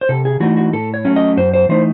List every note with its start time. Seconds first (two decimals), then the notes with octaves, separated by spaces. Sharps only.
0.01 C5
0.09 C3 A4
0.25 G#4
0.40 E3 A3 D#4 F#4
0.57 F#4
0.73 A2 A4
0.94 C#5
1.05 F#3 A3 C#4
1.16 D#5
1.37 F#2 C5
1.54 C5
1.69 E3 A3 D#4 C5